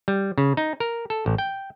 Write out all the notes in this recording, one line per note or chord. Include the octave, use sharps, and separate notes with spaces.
G3
C#3
D#4
A#4
A4
A1
G5